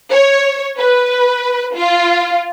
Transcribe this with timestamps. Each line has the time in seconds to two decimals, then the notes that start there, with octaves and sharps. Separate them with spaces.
0.11 C#5
0.78 B4
1.76 F4